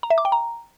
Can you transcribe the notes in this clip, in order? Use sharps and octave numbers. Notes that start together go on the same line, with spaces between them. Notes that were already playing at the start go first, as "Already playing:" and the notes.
A#5
E5
D6
G5
A#5